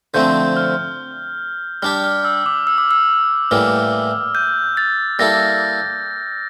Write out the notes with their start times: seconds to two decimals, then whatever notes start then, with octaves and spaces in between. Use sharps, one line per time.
0.14 D3 F3 A3 C4 G6
0.57 F6
1.82 G3 D4 G4 F6
2.04 F6
2.25 E6
2.46 D6
2.67 E6
2.78 D6
2.91 E6
3.51 A2 E3 G3 A#3 F6
4.35 G6
4.77 A6
5.19 G3 A#3 E4 A4 A#6